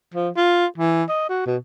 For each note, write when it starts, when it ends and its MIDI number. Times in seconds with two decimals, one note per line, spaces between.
0.14 0.29 53
0.37 0.66 65
0.78 1.03 52
1.09 1.26 75
1.29 1.42 66
1.46 1.57 47